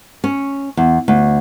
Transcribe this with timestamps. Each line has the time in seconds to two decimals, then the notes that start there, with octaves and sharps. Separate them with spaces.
0.24 C#4
0.77 E2
1.08 D2